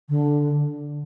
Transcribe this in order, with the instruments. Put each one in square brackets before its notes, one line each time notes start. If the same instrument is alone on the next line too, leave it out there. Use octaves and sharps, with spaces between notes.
[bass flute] D3